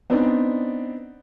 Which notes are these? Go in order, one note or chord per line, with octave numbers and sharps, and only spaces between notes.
B3 C4 D4 D#4 D5